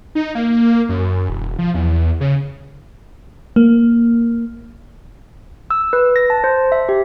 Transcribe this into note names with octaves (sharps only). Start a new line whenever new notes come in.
D#4
A#3
F#2
E1
F3
E2
C#3
A#3
E6
B4
A#6
A5
C5
E5
G4